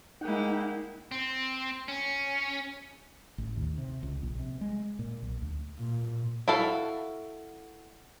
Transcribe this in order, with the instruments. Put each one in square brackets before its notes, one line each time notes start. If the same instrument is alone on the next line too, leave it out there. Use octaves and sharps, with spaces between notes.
[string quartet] G#3 A#3 E4 [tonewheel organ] D#4 F#5 G5
[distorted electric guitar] C4
C#4
[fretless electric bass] A1
D#2
C3
C#2
A#1
C3
G#3
A#2
B1
D2
[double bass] A#2
[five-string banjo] E4 F#4 A4 F5